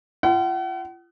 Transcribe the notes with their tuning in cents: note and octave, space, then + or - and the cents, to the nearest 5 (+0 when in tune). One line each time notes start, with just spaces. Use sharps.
F4 -35 F#5 +40